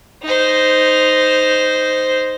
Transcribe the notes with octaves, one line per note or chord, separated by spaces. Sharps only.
D#4 C5